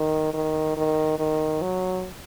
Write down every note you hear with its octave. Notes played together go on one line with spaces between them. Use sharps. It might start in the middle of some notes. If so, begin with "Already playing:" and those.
Already playing: D#3
D#3
D#3
D#3
F#3